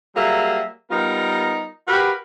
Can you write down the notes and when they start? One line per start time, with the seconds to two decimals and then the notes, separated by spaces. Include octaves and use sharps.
0.15 F#3 G3 A#3 G#4 A4 E5
0.90 G3 B3 D#4 F4 A#4
1.87 F#4 G4 A#4 B4 F5 B5